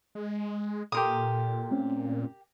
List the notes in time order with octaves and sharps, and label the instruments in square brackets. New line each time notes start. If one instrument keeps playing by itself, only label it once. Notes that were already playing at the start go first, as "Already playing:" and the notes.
[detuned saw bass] G#3
[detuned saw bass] A#2 [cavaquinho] G4 A#4 D#6 [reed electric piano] A4 C6
[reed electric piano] A3 C4 C#4